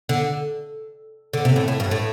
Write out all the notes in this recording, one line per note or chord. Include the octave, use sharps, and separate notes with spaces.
D3
D3
C3
A2
A2
G2
A2